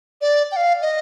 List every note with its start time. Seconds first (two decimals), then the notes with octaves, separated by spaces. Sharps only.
0.21 D5
0.52 G5
0.56 F5
0.82 D#5